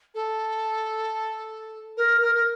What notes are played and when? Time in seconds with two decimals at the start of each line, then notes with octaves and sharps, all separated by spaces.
0.14 A4
1.97 A#4
2.21 A#4
2.34 A#4